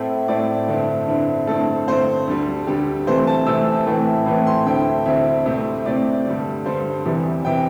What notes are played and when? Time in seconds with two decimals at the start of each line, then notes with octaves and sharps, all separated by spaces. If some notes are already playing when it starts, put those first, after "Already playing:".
Already playing: A2 A3 C4 E4
0.28 A2 A3 C4 E4 D5
0.68 G2 D3 C4 E4
1.08 G2 D3 C4 E4
1.47 G2 D3 A3 C4 E4 A4
1.88 G2 D3 A3 C4 E4 C5
2.27 D2 D3 G3
2.67 D2 D3 G3 G4
3.07 C3 E3 A3 C4 C5
3.27 A5
3.46 C3 E3 A3 C4 E6
3.86 A2 E3 A3 C4 E4
4.26 A2 E3 A3 C4 E4
4.47 C6
4.66 D2 D3 C4 E4 G5
5.06 D2 D3 C4 E4 E5
5.46 C3 A3 C4 E4
5.86 C3 A3 C4 E4 D5
6.25 G2 D3 G3
6.66 G2 D3 G3 C5
7.05 E2 C3 E3 G3
7.45 C3 E3 G3 G5